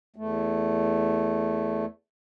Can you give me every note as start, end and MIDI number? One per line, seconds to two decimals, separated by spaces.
0.16 1.85 40
0.16 1.85 57